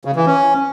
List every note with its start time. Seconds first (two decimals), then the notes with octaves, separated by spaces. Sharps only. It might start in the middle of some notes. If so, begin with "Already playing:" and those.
0.05 C#3
0.16 E3
0.26 C#4